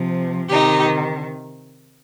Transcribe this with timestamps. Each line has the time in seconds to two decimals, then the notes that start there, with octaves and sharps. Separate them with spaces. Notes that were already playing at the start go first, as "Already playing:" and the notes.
Already playing: C3 F3
0.50 C3 D#3 D#4 G4